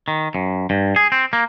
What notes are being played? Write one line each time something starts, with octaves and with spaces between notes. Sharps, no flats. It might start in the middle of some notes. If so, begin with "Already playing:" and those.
D#3
F#2
G2
G#4
C4
A#3